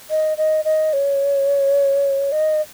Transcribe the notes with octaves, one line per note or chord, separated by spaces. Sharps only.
D#5
D#5
D#5
C#5
D#5